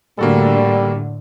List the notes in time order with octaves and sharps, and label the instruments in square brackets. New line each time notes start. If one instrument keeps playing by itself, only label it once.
[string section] A2 D3 [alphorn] G3 [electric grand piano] A#3 F#4 A4